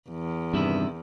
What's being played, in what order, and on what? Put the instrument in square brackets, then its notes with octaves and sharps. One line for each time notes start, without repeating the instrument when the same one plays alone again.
[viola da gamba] E2
[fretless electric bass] G2 [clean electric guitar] C3 D#3 E4